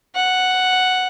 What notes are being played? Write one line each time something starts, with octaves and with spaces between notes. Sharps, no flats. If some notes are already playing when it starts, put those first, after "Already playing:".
F#5